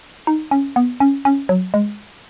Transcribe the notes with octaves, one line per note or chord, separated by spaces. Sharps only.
D#4
C#4
B3
C#4
C#4
F#3
G#3